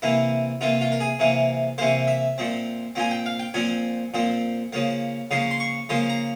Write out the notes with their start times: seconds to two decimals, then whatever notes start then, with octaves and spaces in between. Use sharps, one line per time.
0.02 C3 E3 A#3 E4
0.61 C3 E3 A#3 F4
0.81 F4
0.92 A#4
1.00 G#4
1.19 C3 E3 A#3
1.78 C3 E3 A#3 C5
2.08 E5
2.38 A#2 F3 C4
2.95 A#2 F3 C4 G#5
3.11 G5
3.26 F5
3.39 G5
3.54 A#2 F3 C4 G#5
4.14 A#2 F3 C4
4.73 C#3 F3 A#3
5.31 C#3 F3 A#3 C6
5.51 C6
5.60 C#6
5.89 C#3 F3 A#3 C6
6.09 A#5